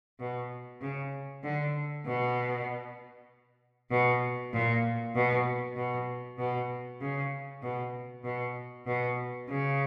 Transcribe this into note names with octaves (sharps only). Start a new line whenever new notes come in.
B2
C#3
D3
B2
B2
A#2
B2
B2
B2
C#3
B2
B2
B2
C#3